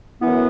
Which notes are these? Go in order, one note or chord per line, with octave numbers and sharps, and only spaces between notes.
F#2 E3 B3 E4